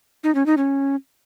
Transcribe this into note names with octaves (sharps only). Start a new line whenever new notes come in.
D#4
C#4
D#4
C#4